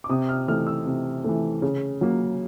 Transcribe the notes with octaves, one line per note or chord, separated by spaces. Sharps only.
D6
C3 D#6
F6
E3 A3 F6
E6
C3
E3 A3
C#3
F#3 A#3